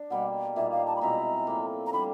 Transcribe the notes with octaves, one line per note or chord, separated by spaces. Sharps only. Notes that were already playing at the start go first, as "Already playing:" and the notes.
Already playing: D4
B2 G3 A#3 F#5
A#2 G3 A#3 D#4 E5
F5
A5
B5
B2 G#3 C4 E4 A#5
A2 F3 A#3
A#5
D3 G3 A#3 B5